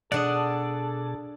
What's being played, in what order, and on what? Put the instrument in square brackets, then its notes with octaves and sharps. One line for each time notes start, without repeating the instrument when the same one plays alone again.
[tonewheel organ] B2 G#4 A5 [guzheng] D4 F#5 [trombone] A4 [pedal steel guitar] D5 D#6